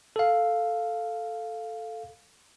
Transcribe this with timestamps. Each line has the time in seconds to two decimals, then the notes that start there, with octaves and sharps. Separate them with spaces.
0.16 A4 F5